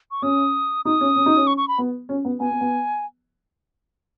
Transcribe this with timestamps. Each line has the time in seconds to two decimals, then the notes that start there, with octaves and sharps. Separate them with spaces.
0.11 C#6
0.22 C#4 D#6
0.85 D#4 D#6
1.01 C#4
1.16 C#4
1.26 D#4
1.36 C#4
1.47 C#6
1.57 C#6
1.68 B5
1.78 B3
2.09 C#4
2.25 B3
2.40 B3 G#5
2.50 B3
2.61 B3